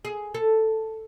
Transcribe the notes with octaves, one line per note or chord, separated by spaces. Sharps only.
G#4
A4